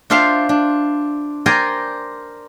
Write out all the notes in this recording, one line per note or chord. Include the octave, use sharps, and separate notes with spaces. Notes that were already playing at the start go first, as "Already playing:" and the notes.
D4 F4 C5 E5 F5 G5
D4
A#4 C5 D5 G5 G#5 A#5